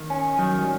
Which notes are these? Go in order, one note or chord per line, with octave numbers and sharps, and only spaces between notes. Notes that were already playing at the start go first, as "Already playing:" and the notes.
Already playing: D#3
C#4
D#3 F#3
G3